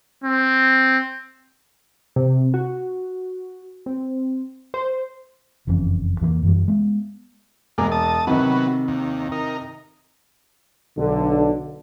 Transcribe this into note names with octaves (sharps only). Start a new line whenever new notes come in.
C4
C3
F#4
C4
C5
F#1 F2 E3 C#4
E2 E3 F#3 A#3
F#2 E3 G3
G#3 B3
E1 G#3 A#3 D6
A5 D#6
C3 D#3 F#3 B3
D#2
D#4 A#4
B1 D3